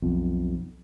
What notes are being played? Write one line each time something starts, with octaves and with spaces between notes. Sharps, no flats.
B1 F2